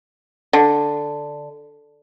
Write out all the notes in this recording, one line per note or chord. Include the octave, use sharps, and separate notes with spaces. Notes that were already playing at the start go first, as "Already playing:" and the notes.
D3